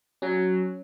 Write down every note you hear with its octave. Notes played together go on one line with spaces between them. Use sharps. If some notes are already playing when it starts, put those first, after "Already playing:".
F#3 C#4